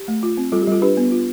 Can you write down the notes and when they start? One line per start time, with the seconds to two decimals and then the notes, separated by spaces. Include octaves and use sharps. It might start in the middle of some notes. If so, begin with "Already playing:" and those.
Already playing: G4
0.08 A3
0.23 F4
0.38 C4
0.52 G3 F4 A4
0.62 G4
0.67 G3 F4 A4
0.82 D4 G4 B4
0.97 B3
1.11 F4